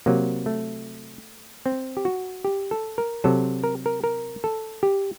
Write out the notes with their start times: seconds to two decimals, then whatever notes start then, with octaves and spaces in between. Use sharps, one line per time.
0.06 C3 F#3 A#3
0.46 A3
1.66 C4
1.97 G4
2.05 F#4
2.45 G4
2.71 A4
2.98 A#4
3.24 C3 F#3 A4
3.64 A#4
3.86 A#4
4.04 A#4
4.44 A4
4.83 G4